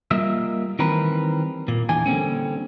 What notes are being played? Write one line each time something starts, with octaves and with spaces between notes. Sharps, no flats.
G3 A#3 F4 A#4 D#5 E5
D#3 E3 G3 C4 A#4 B4
A#2 A#3
E2 E3 B3 D4 G#5
D3 G3 A#3 C4 C#4